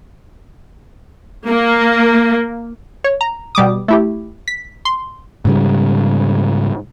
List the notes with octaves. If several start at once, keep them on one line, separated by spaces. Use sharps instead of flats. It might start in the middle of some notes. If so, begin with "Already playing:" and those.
A#3
C#5
A#5
B2 G3 D6 D#6
A3 E4 G4
B6
C6
G#2 C#3 G3